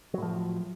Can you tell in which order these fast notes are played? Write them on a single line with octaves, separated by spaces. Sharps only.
F#3 A2 F3